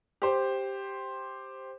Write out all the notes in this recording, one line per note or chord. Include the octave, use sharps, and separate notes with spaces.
G4 C5